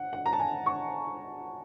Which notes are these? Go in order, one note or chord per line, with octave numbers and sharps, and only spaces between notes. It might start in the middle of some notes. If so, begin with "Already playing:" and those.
Already playing: F#5
F#5
A#5
A5
G#5
C#6